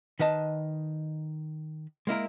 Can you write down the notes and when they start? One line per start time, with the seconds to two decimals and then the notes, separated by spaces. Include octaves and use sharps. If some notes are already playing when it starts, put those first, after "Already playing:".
0.20 D#3 B4 D#5 A5
2.07 G#3 A#3 E4 A#4